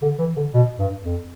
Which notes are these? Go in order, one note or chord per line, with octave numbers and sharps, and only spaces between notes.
D3
E3
D3
B2
G2
F2